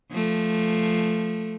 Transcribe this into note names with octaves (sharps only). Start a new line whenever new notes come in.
F3 A3